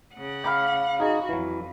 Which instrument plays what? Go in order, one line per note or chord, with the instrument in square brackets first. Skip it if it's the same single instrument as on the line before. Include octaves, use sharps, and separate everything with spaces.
[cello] C#3 F#5
[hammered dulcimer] F5 B5 D6 [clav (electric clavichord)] G5
[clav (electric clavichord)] D#4 G#4 D#5 [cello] F#4
[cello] F2 [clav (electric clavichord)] E3 F#3